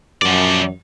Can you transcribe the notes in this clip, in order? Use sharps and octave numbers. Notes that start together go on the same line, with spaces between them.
F#2 F3 D5